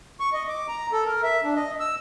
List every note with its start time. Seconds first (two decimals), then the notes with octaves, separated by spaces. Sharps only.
0.20 C#6
0.33 D#5
0.48 D6
0.68 A#5
0.92 A4
1.06 A#4
1.23 E5
1.44 D4
1.56 D#5
1.80 E6